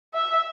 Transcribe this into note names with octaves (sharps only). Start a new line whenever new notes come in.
E5